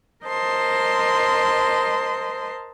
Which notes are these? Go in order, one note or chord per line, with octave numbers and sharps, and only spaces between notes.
A#4 C5 D#5 A5 C6